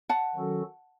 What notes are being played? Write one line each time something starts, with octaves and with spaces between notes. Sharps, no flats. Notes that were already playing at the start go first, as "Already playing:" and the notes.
F#5 A5
D#3 F#3 C#4 F#4 A4